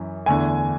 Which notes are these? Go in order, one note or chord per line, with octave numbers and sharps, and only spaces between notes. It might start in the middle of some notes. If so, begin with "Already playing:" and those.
Already playing: F#2 E3
E2 D3 A3 G#5